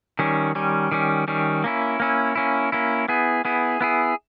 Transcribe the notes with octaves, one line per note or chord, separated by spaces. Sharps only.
D#3 G3 C#4
D#3 G3 C#4
D#3 G3 C#4
D#3 G3 C#4
A#3 C#4 E4
A#3 C#4 E4
A#3 C#4 E4
A#3 C#4 E4
B3 E4 G#4
B3 E4 G#4
B3 E4 G#4